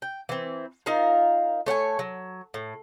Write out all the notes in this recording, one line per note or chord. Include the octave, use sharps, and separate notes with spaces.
G5
E3 C4
D#4 F4 A#4 F5
A3 C#5 F#5 G#5
F#3
A2